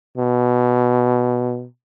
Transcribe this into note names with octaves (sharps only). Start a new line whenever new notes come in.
B2